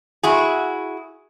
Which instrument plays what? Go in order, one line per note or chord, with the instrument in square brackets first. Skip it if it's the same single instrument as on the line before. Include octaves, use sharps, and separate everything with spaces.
[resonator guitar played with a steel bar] E4 F#4 G#4